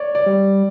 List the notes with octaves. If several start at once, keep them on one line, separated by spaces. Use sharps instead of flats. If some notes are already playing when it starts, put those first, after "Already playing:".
Already playing: C#5 D5
D5
G3